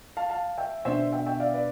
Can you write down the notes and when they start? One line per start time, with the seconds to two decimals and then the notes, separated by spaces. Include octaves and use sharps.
0.17 F5 A5
0.30 F5 A5
0.58 E5 G5
0.85 B2 B3 D4 C5 E5
1.13 E5 G5
1.27 E5 G5
1.40 D5 F5
1.54 B4 D5